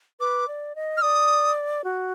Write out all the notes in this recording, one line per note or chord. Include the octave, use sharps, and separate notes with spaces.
B4 D6
D5
D#5
F6
D5 D#6
F#4